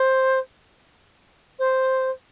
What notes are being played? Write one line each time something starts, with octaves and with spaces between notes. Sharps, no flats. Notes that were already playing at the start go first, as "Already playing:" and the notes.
Already playing: C5
C5